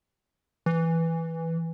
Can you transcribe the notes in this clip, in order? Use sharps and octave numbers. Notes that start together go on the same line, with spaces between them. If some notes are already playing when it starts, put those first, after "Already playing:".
E3